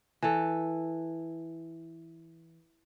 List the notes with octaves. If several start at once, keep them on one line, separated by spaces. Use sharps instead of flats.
E3 A4